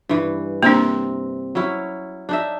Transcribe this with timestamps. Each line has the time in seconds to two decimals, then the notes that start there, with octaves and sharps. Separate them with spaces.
0.09 G2 E3
0.63 C3 A#3 C4 D4 A#4
1.55 F#3 C#4 E4
2.29 D4 D#4 E5